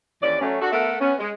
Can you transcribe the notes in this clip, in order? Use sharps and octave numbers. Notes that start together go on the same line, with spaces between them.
D#2 E3 C#4 D5
F#3 A3 C#4
D4 F#4 A4
A3 B3 A4 A#4 E5 F#5
B3 C#4
G#3